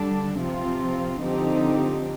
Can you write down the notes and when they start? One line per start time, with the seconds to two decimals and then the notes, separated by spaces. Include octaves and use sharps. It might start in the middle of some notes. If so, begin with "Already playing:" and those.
Already playing: D3 G3 D4
0.37 C3 F3 C4 F4
1.20 D3 F3 C4 D#4 G4